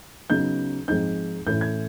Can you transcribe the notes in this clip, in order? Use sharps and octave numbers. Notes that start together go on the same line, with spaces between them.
C#3 F#3 B3 D#4 G6
G#2 F3 G#3 C4 D#4 G6
A2 E3 A3 C#4 E4 G6
G#6